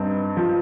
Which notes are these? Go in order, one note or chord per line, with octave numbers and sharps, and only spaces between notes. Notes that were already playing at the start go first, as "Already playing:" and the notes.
Already playing: G2 C4 D#4
F3